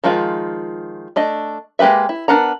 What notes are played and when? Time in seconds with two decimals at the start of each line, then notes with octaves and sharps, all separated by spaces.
0.04 D#3 F3 G#3 F4
1.16 A3 D4 D#5
1.79 G#3 A#3 G4 B4 E5
2.09 E4
2.28 B3 D4 A#4 F#5 A#5